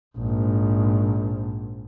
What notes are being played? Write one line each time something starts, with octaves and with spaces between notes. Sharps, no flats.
A#1 G#2